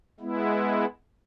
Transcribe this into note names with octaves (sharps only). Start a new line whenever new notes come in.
G#3 B3 E4